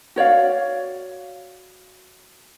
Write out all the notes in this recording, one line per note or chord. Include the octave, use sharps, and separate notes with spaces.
F#4 C#5 D5 F5